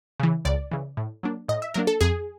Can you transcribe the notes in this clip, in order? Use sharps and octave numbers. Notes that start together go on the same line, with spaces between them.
C#3 E3
C#2 D5
C#3 E3
A2
F#3 A#3 D4
A2 D#5
E5
F#3 A#3 D4 A#4
A4
F2 G#4